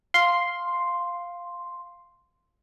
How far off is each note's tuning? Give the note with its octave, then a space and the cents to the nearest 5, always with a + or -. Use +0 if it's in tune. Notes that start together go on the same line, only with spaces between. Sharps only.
F5 +0 C6 +0